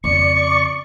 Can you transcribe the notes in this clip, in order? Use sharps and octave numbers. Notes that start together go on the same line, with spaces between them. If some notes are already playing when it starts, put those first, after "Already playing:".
F2 C#3 D5 C#6 C#7